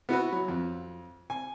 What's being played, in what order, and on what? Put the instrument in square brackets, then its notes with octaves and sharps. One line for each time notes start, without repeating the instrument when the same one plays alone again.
[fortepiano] B3 E4 F#4 B4
F#3
F2
G#5